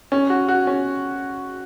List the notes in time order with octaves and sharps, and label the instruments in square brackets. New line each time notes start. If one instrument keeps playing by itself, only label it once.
[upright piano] C#4
F#4
F#4
C#4